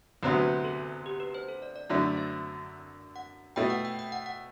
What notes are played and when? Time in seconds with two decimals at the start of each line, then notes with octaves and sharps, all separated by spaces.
0.23 D2 C3 F#3 B3 B4
0.65 A4
1.06 G4
1.20 B4
1.35 C5
1.49 A4
1.62 D5
1.76 D5
1.90 F#2 D3 A3 E4 D5
2.04 C5
2.17 E5
3.16 F#5
3.56 B2 A3 E4 G5
3.70 F#5
3.85 G5
3.99 G5
4.12 F#5
4.26 F#5